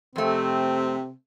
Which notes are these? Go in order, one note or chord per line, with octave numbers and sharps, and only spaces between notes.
F2 C3 A3 C4